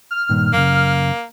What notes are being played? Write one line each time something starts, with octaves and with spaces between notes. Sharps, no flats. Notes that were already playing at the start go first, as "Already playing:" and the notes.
F6
G2 A#2 D#3
F#2 C#3 A#3